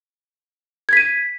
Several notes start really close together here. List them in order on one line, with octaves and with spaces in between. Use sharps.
G#6 B6 D#7